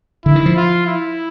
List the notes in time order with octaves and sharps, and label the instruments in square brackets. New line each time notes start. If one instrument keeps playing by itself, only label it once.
[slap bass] D3 [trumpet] E4
[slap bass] D#3
F3
[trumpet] F4
E4